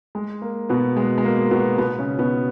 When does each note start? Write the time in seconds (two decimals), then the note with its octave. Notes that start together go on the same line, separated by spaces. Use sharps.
0.15 G#3
0.42 A#3
0.69 B2 B3
0.97 G#3
1.18 G#3
1.24 A#3
1.51 B2 B3
1.78 B2 B3
1.99 C#3 C#4
2.19 B2 B3